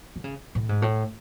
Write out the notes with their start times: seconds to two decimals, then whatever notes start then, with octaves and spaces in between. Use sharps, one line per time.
0.16 D3
0.24 C#3
0.55 A2
0.69 G#2
0.82 A2